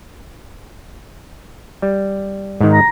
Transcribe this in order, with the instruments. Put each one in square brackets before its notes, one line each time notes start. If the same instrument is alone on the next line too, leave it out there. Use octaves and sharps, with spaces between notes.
[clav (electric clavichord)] G3
G#2 D#3
[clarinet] A#5